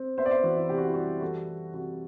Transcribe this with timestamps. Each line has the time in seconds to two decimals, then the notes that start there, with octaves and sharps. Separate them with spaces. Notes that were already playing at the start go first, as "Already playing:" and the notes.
Already playing: C4
0.18 B3 C5 E5
0.26 D5
0.31 C5 E5
0.43 E3 F#4
0.57 E4
0.69 C3 G4
0.78 F#4
0.86 E4
0.94 G3 F#4
1.21 E3 F#4 A4
1.48 G3
1.74 C3 F#4